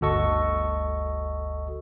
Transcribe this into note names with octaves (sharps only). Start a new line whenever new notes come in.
G1 D2 F#4 A4 D#5 C#6